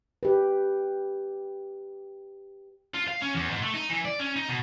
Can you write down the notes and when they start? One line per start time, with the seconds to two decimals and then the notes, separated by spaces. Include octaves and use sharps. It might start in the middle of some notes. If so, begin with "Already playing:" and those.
0.23 G4 B4
2.94 F4
3.08 F5
3.22 C#4
3.35 E2
3.50 G#2
3.63 A3
3.74 D#4
3.90 E3
4.05 D5
4.20 C#4
4.36 D#4
4.49 B2